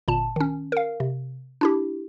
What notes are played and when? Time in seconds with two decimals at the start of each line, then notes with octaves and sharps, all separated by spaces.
0.08 G1 A#2 A5
0.36 D#3 C#4
0.72 A#4 F5
1.00 C3
1.61 D4 E4 G4